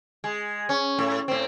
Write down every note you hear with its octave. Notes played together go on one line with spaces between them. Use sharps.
G#3
C#4
A2
A2 C4